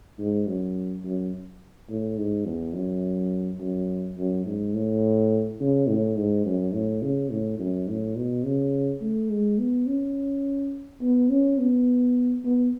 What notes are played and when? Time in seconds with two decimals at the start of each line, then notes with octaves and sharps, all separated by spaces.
0.19 G#2
0.47 F#2
1.04 F#2
1.89 A2
2.18 G#2
2.46 E2
2.74 F#2
3.60 F#2
4.17 F#2
4.46 G#2
4.74 A2
5.60 C#3
5.88 A2
6.17 G#2
6.46 F#2
6.74 A2
7.02 C#3
7.31 A2
7.59 F#2
7.88 A2
8.16 B2
8.45 C#3
9.01 A3
9.30 G#3
9.59 B3
9.87 C#4
11.01 B3
11.30 C#4
11.58 B3
12.44 B3